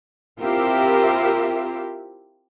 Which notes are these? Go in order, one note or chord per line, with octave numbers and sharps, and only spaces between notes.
C4 E4 F4 G4 A#4 E5